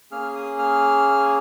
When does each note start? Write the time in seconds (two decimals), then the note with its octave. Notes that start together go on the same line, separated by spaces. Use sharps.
0.11 A#3 C#4 G#4 F6
0.35 D#6
0.59 F6